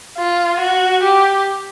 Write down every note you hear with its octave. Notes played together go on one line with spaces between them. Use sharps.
F4
F#4
G4